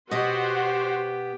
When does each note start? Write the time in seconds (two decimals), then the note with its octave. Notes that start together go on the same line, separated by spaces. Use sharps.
0.11 B2 B3 F#4 G4 C5 D#5